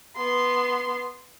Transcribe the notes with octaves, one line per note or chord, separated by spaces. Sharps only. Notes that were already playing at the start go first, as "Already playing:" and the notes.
B3 C6